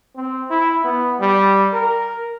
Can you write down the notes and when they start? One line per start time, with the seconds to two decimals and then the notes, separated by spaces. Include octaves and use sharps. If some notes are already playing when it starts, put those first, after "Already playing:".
0.16 C4
0.50 E4
0.84 B3
1.20 G3
1.73 A#4